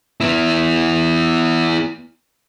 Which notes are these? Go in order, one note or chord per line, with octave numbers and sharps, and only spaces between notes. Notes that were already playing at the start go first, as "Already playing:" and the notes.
B3 E4